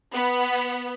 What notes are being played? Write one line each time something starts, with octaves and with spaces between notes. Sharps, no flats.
B3